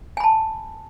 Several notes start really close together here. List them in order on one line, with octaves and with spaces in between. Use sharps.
G#5 B5 A5